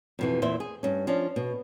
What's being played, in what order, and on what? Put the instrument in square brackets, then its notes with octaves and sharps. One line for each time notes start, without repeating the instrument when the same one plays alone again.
[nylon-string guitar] F2 B2 E3
E2 A#2 C5 E5
G#4
G2 C#4
F3 C#4 D4
B2